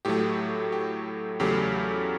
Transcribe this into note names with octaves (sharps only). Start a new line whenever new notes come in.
A2 F#3 A3 G4
G4
E2 C#3 F#3 A3 G4